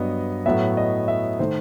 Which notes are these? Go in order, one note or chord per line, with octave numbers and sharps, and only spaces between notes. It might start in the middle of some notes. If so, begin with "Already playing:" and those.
Already playing: G2 F#3 B3 D#5
A2 F#3 B3 E5
D#5
E5
D#3 A3 C5